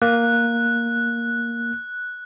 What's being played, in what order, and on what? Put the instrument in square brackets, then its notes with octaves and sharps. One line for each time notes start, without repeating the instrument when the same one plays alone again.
[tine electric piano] A#3 [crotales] F#6